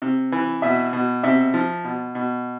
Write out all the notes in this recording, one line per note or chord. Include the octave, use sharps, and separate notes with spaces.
C3
E3
B2 E5
B2
C3 E5
F3
B2
B2